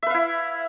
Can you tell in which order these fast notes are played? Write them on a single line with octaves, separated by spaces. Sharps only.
E5 B4 F5 E4